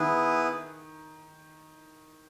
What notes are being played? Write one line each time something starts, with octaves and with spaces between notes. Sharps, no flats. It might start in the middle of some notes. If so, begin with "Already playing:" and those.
Already playing: D#3 B3 E4 G#4 B4